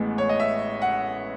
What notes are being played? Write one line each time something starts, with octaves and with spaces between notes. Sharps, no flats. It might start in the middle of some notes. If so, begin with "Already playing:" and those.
Already playing: A1 A2 G#3 B3
C#5
D#5
E5
F#5